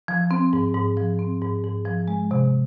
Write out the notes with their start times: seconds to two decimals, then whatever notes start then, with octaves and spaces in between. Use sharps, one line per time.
0.08 F3
0.31 C4
0.53 G#2
0.74 G#2
0.97 F3
1.19 C4
1.42 G#2
1.64 G#2
1.85 F3
2.08 G#3
2.31 C3